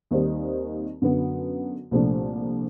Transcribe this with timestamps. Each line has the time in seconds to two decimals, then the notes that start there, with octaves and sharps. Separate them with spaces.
0.11 D#2 D#3 G3 C4 D#4
1.01 F#2 D3 F#3 B3
1.91 C2 A#2 F3 A3 D4